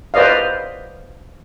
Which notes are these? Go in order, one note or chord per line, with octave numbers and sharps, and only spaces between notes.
B4 C5 D5 D#5 F5